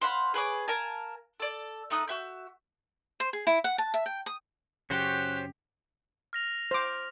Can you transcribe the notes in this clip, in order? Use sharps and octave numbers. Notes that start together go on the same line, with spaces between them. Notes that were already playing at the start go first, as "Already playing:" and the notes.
C5 F5 F#5 B5
G#4 B4 C#5 D6
A#4 F5 G#5 A5
A4 D5
A3 D#4 D#6 F#6
F#4 E5 G6
C5
G#4
E4
F#5
A5
E5
G5
D#6
F#2 C#3 C#4 F#4 G4 C5 F#6
F6 A#6 F7
C5 D6